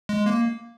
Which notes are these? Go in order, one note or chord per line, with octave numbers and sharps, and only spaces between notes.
G#3
A#3